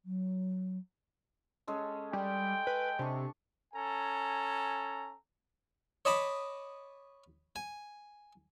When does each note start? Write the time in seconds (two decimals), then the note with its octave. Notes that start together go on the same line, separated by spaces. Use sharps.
0.05 F#3
1.67 G#3 C#4 A4
2.13 G3 G5
2.67 B4
2.99 C3 D4 C#6
3.74 C#4 A4 G#5 A#5
6.05 C#5 D#5 A5 B5 D6
7.56 G#5